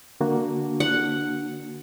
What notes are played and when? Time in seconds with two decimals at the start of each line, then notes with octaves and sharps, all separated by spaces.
0.21 D3 A#3 D4 F#4
0.80 F#5